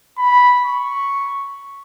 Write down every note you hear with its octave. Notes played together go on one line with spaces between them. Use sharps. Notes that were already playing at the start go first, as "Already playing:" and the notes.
B5
C#6